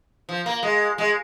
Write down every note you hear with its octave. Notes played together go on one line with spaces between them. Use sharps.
F3
A#3
G#3
G#3